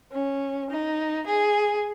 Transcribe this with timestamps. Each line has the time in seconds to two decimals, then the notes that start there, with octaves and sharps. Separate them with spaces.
0.11 C#4
0.69 D#4
1.26 G#4